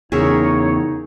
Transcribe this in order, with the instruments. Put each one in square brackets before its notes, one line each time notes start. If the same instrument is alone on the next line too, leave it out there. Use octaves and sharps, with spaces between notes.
[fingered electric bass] E2 C#3 [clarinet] D#4 [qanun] G#4 A#4 E5 [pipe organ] C#5